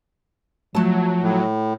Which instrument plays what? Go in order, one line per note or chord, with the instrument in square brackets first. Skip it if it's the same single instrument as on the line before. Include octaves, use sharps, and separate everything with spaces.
[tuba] F3 [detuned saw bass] F#3 [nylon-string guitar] A3 A5
[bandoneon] A2